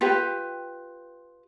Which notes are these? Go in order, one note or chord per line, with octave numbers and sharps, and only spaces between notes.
F4 G4 B4 G5